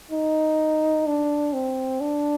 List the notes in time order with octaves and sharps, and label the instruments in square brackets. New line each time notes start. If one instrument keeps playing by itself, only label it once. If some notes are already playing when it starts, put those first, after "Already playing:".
[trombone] D#4
D4
C4
D4